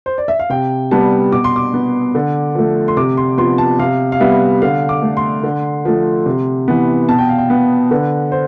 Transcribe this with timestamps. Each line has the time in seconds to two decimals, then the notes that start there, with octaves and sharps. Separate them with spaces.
0.06 C5
0.18 D5
0.28 E5
0.39 F5
0.50 C3 G5
0.91 G3 B3 A5
1.32 B2 D6
1.44 C6
1.56 D6
1.74 B3
2.15 D3
2.55 F3 A3
2.88 C6
2.97 C3 D6
3.17 C6
3.38 F3 B3 C6
3.58 A5
3.79 C3 F5
4.12 F5
4.20 G3 B3 E5
4.62 D3 F5
4.89 D6
5.02 A3
5.17 C6
5.43 D3
5.85 F3 A3
6.26 C3
6.68 E3 B3
7.09 B2 A5
7.18 G5
7.29 F5
7.38 G5
7.50 B3
7.91 D3 B4
8.32 C5